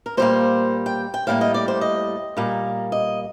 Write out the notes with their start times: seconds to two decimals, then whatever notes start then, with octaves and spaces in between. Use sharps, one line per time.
0.06 A#4
0.17 A#2 G3 A#3 C5
0.86 G5
1.14 G5
1.27 A2 G3 A#3 F5
1.41 D#5
1.54 D5
1.68 C5
1.81 D#5
2.37 A#2 G3 A#3
2.92 D#5